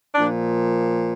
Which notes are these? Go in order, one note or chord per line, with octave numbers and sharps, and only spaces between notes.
A#2 F3 D4